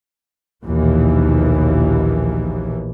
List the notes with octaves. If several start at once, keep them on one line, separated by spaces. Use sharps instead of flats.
A#1 D#2 B2 E3